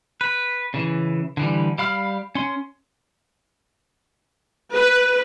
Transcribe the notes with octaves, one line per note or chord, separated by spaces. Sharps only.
B4
C#3 E3
D3 E3 G3
G3 F5 B5 F6
C#4 C6
B4